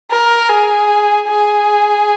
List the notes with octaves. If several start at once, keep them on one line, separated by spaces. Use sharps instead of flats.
A#4
G#4
G#4